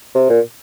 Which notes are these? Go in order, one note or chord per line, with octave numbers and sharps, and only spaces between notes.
C3
A#2